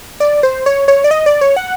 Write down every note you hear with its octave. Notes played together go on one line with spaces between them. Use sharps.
D5
C5
C#5
C#5
D5
D#5
D5
C#5
F#5